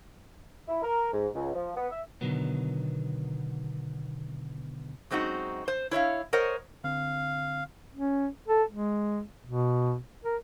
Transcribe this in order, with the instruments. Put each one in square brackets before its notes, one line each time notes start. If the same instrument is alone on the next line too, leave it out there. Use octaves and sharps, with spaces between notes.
[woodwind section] E4
A#4
G#2
C#2
F3
B3
E5
[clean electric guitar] B2 D3 D#3 F#3 B3
[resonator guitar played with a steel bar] F#2 G#3 C4 D#4 F#4
C5
E4 C#5 E5 F5
A#4 C5 C#5 D#5 F#5
[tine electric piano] D3 C4 [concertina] F5
[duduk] C#4
A4
G#3
B2
A#4